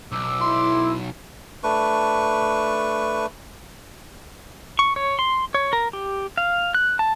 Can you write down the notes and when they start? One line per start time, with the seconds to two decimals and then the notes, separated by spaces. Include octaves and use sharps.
0.12 B1 D6 E6
0.41 E4 C6
1.64 A3 D4 B4 C#6
4.79 C#6
4.96 C#5
5.19 C6
5.54 C#5
5.73 A#4
5.93 G4
6.38 F5
6.75 F#6
6.99 A5